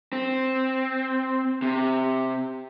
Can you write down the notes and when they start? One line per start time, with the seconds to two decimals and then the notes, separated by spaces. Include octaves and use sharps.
0.13 C4
1.62 C3